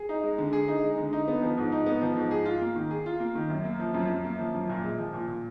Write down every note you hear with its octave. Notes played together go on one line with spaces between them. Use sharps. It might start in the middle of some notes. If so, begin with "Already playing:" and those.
Already playing: G#4
D#4
G#3
D3
G#4
D#4
G#3
D3
D#4
B3
F3
G#2
D#4
B3
F3
G#2
G#4
F4
A#3
D#3
G#4
F4
A#3
D#3
F#2
A#3
F3
F#2
F#2
A#3
F3
F#2
A#2
G#3
F3
A#2
A#2